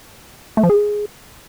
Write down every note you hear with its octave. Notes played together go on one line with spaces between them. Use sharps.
A3
F3
G#4